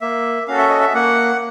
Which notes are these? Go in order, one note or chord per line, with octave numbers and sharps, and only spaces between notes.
A#3 E5
C#4 F#4 A4 F5
E5
D#5
E5
A#3 F#5